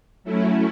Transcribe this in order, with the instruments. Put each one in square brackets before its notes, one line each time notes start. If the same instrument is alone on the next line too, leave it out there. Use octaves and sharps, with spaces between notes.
[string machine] F#3 A3 C#4 E4